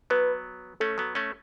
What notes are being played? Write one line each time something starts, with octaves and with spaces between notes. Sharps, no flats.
F#3 B3 B4
A3 C#4 A4
F#3 B3
A3 C#4